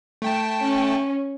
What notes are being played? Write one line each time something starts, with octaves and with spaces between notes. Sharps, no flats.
A3 G5 A5
C#4